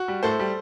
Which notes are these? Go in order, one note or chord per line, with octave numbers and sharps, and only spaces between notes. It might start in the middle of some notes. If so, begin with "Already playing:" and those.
Already playing: F#4
G3
A2 A4 C5
G3